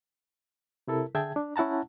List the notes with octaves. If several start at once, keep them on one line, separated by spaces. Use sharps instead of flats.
C3 E4 A4 A#4
D3 G#4 E5 G5 A5 G#6
D4
C#4 E4 F#5 A5 A#5